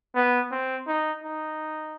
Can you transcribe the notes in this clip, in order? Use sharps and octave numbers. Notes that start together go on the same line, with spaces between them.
B3
C4
D#4
D#4